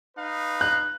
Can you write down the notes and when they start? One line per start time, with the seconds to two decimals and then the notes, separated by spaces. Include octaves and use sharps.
0.16 D#4 B4 F5
0.61 F#6